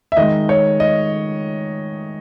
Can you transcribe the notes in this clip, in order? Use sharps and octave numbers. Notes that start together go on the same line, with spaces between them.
E5
D#3 G#3 D#5
C#5
D#5